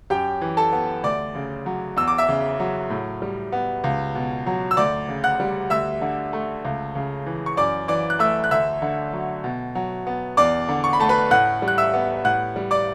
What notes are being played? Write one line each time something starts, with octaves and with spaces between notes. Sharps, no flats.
F#2 G4 G5
E3
A4 A5
B3
D2 D5 D6
C#3
F#3
E2 E6
D6
E5 E6
C#3
F#3
A2
G3
B3
C#2
B2
F#3
E6
D2 D5 D6
C#3
F#5 F#6
G3
D2 E5 E6
D3
A3
C#2
C#3
E3
C#6
F#2 D5 D6
E3 D5 D6
F#6
A3 E5 E6
F#6
D2 E5 E6
D3
F#3
B2
F#3
B3
E2 D5 D6
D3
C#6
B5
A3 A5
B4 B5
A2 F#5 F#6
G3
F#6
E5 E6
B3
A2 F#5 F#6
G3
D5 D6